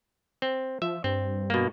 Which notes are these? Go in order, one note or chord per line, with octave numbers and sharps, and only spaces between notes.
C4
F3 E5
G2 C4
B2 A#3